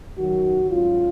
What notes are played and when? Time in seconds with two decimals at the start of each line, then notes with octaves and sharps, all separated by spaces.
0.17 F#2 D#3 F#3 F#4
0.70 G#2 F#3 C#4 F4